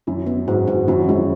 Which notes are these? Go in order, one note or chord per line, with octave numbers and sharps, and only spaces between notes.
F#2 F#4
B3
G#2 F#4
G#2 F#4
F#2 F#4
F2
F#2 G#3